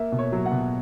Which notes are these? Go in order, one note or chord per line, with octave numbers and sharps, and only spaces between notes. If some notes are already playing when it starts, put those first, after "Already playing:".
Already playing: A#3 E5
B2
C#5
F#3
F#5
B2